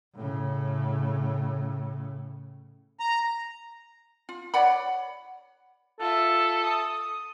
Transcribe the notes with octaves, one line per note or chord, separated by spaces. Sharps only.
A2 C#3
A#5
F4
C#5 D5 F#5 B5
F4 A4 E5
D#6